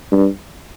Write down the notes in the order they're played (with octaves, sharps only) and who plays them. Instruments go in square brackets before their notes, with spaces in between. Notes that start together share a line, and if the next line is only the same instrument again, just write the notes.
[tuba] G2